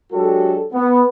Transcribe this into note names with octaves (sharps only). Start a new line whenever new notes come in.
F#3 G#3 D4 F#4 G4 A4
B3